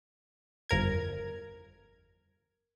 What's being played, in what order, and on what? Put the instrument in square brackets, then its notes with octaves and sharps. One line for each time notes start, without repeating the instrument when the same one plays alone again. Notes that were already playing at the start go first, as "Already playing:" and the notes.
[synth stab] G1 F2 A#4 G#6